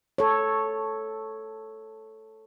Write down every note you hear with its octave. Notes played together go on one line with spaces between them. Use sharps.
A4 C#5